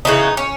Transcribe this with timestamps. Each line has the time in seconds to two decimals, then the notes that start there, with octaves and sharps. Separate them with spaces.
0.05 C#3 E3 B3 D#4
0.37 C#4